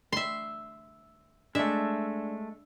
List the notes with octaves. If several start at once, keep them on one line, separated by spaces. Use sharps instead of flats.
E5 C6
G#3 A3 D4 E5